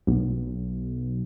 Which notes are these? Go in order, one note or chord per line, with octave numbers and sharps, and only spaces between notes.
B1